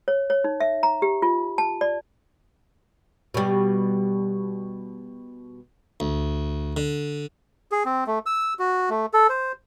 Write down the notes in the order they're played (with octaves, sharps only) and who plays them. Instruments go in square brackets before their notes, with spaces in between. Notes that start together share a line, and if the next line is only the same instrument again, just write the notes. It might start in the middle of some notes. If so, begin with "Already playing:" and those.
[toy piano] C#5
C#5
D#4
E5
A#5
G4
F4
A5
D5
[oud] B2 G3
[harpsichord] D2
D3
[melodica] G#4
C4
A3
E6
F#4
A3
A4
C5